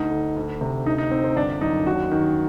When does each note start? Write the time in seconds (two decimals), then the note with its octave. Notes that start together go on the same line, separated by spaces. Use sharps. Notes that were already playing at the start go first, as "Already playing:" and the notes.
Already playing: D2 D#4
0.11 D3
0.36 D2
0.61 C3
0.86 D2 D#4
0.98 D#4
1.11 D3 C4
1.24 C4
1.36 G1 D4
1.61 F#2 D#4
1.86 D#2 F#4
2.11 D#3